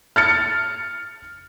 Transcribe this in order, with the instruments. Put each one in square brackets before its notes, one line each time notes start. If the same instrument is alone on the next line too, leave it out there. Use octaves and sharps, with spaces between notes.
[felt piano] F6 A6 C#7